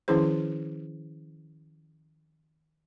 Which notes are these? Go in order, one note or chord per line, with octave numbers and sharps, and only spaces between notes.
D#3 F3 C#4 E4 G#4 C5